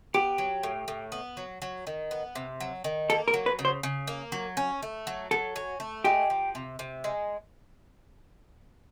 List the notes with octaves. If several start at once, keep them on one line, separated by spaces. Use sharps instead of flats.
B3 G4
F#3
A2
A2
B3
F#3
F#3
D#3
B3
C3
F#3
D#3
A#3 A4
A#4
F#3
B4
C#3
C5
C#3
A#3
F#3
C#4
A3
F#3
F#3 A4
C#4
A3
G#3 G4
F3
C3
C3
G#3